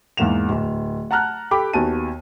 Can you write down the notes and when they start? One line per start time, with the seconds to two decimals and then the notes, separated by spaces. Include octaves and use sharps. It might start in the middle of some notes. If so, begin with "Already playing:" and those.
0.17 E2 G#2 A#3 F#5 E7 F7
0.49 D1
1.11 F#5 A5 A#5 F6 F#6
1.51 G4 A4 G5 B5 D6
1.73 D#2 B3 F#4 G#5 A5 D#7